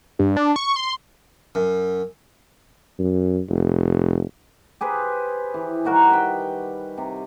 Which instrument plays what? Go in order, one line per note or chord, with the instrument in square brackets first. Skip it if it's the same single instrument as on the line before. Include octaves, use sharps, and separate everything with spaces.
[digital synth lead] G2
D4
C#6
C6
[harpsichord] F#2
[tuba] F#2
F1
[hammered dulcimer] G4 G#4 B4 C5
E3
D#3 G3 F#4 A#4
B4 G5
C3